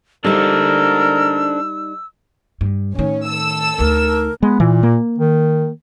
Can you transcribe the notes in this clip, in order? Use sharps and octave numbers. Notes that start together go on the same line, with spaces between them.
G3 D4 D#4 A4 A#4 C5 E6
G2
A2 D#3 C#4
A4 E6
D2 D#4 A#4
G#3 B3
A#2 E3
A#3
D#3